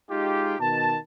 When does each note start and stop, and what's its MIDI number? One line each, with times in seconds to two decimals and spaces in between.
0.10 0.56 56
0.10 0.56 63
0.10 0.56 65
0.10 0.56 67
0.60 0.98 47
0.60 0.98 51
0.60 0.98 81